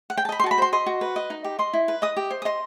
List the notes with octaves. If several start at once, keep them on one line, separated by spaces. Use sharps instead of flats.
F#5
G5
A5
D#5 B5
C6
F#4 A5
B5
C5 C6
D#5 C6
F#4
B4
D#5
D#4
G4
D#5 C6
E4
B4
D#5 D#6
G4
C5
D#6
D#5 C6